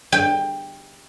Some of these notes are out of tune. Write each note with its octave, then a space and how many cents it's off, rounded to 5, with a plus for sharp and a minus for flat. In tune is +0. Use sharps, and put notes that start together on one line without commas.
G5 +15